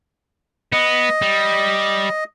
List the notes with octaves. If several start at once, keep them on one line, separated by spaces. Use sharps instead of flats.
B3 D#5
G3